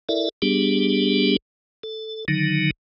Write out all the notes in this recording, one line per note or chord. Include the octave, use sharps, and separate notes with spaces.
E4 A4 A#4 D5 E5
G3 B3 D4 G4 G#4
A4
D3 D#3 F#3 D#4